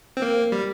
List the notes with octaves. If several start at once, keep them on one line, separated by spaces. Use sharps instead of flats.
C4
A#3
G3